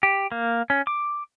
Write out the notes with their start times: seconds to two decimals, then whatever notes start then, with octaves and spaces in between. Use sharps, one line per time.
0.03 G4
0.32 A#3
0.70 C#4
0.87 D6